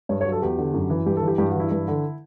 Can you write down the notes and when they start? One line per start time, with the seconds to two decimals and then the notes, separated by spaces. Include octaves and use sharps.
0.09 G2 C#5
0.21 C#5
0.25 F#3
0.32 A4
0.42 E2 G4
0.58 D3
0.74 F#2
0.90 E3
1.06 G2 G4
1.17 A4
1.22 E3
1.28 G4
1.38 G2 G4
1.50 F#4
1.55 E3 E4
1.71 G2
1.88 D3